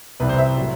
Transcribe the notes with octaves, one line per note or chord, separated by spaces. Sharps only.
C2 C3 E3 G3 B4
C5
E5
A2 F#3